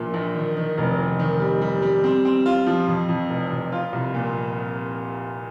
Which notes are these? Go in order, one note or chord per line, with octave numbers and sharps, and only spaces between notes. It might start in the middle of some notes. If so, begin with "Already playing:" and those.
Already playing: A#1 A#2 A#3
A#1
D#3
D#3
F1
F1
D#3
G3
G3
G3
C4
C4
F4
F3
F2
F2
F1
F2
F4
C2
A#2